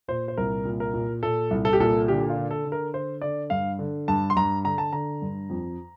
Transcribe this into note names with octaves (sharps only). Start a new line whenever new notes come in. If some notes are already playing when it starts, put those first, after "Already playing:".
A#2 C5
C5
C2 A#4
A#2
A#4
A#2
A#2 A4
C2
A4
G4
A#2 A4
D3 G4
F4
D3
A4
D3
A#4
D3 C5
D3 D5
G2 F5
D3
G2 A5
C6
G2 A#5
D3 A#5
A5
D3 A#5
G2
F2